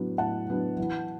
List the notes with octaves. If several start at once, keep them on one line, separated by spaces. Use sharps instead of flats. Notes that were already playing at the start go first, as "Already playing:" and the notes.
Already playing: A2 F#3 B3 D4
A2 F#5 A5
F#3 B3 D4
E3